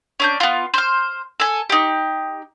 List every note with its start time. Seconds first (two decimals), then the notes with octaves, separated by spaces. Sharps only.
0.20 C#4 D4 G6
0.40 B3 F4
0.74 C5 F6
1.40 A4 G#5
1.70 D#4 G4